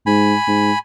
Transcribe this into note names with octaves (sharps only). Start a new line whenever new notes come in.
G#2 G#5 B5
G#2